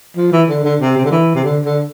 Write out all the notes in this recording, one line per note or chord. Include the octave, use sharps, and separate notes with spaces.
F3
E3
D3
D3
C3
C3
D3
E3
C3
D3
D3